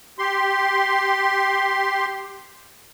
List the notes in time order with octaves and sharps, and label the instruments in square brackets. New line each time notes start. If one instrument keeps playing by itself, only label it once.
[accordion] G4 C6